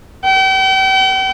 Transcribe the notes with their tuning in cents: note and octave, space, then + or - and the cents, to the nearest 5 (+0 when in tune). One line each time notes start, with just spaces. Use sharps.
G5 -40